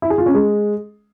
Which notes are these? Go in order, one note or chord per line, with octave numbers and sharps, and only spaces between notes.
E4
G#4
F4
C#4
G#3